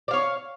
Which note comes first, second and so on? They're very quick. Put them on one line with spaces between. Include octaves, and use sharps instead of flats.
D5 F5 C#5